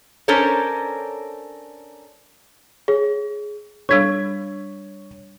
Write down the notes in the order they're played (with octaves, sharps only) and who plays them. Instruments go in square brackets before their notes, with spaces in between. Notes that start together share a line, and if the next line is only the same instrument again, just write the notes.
[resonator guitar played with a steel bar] C#4 D4 A4 A#4 C5 C#5
[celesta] G#4 [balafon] C#5
[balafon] G3 D4 A4 [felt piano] C#5 [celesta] C#6 G#6